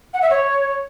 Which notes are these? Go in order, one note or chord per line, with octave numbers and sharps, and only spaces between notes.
F#5
E5
C#5